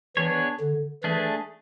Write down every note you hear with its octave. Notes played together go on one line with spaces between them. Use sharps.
E3 B3 D4 G#4 C#5
D3
E3 A3 D4 G#4